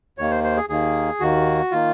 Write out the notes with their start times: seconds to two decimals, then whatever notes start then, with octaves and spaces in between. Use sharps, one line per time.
0.18 D#2 D#3 A#3 C#5
0.31 C5
0.44 C5
0.57 G#4
0.69 D#2 D#3 A#3 G#4
1.20 D#2 D#3 A#3 F#4
1.72 D#3 A#3 F4